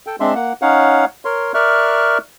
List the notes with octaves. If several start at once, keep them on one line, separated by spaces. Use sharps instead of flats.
A4 G5
G#3 C4 D4 E5 C6
A#3 F#5
C#4 D#4 C#5 F5 F#5
A#4 C#5 C6
A#4 D5 E5 C#6 F6 F#6